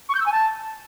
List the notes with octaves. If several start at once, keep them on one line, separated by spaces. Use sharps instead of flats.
C#6
G6
E6
G#5
A5